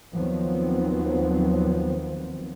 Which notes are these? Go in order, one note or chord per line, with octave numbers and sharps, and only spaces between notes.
D#2 D#3 F3 F#3 B3 C4